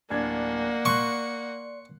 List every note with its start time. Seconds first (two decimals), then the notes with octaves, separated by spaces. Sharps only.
0.10 D1 A#3 D4 D5 F#5 G#6
0.85 C6 C#6 F#6